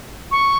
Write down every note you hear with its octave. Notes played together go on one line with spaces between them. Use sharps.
C#6